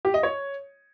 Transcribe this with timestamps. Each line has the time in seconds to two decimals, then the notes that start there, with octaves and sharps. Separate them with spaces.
0.05 G4
0.14 D#5
0.23 C#5